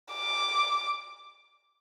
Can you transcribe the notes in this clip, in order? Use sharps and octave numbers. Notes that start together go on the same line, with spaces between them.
D6